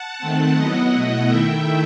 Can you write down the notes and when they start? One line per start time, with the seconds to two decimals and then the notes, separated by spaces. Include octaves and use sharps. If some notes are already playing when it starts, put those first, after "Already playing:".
Already playing: F#5 A5
0.19 D#3 A3 C4
0.55 F#3 B3 E4 D#5 F#5
0.92 B2 A3 E4
1.28 D#3 A3 E4 E5 G5